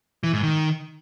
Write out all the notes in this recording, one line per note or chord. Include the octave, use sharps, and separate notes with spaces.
E3
G#2
D#3